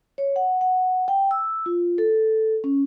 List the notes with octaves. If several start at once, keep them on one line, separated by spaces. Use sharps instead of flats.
C#5
F#5
F#5
G5
E6
F4
A4
C#4